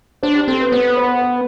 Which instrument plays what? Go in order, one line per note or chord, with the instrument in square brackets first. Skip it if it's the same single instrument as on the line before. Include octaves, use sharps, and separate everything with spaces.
[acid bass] D4 [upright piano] C5
[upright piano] G4
[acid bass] C4 [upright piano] A4
[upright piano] B4
[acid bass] B3 [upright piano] C5
[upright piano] B4
C5
B4